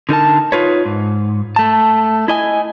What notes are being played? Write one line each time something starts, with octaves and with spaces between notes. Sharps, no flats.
D3 D#4 A#4 A5
D#4 F4 B4 C#5
G#2
A3 A5
E4 D#5 G#5